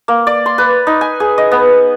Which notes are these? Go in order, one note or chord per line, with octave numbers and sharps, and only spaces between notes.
A#3
D5
C6
B4
D#4
G#5
G#4
D#5
B3